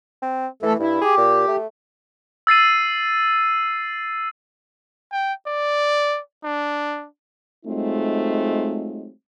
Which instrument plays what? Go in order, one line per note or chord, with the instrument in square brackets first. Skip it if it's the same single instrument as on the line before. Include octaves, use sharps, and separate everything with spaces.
[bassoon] C4
[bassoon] E3 [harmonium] A3 A4
[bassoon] G2 [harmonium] E4
[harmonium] G4 [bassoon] G#4
[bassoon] A#2
A3
[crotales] E6 A6 C7 D#7
[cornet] G5
D5
D4
[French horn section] F#3 G#3 A3 C4 D#4 F4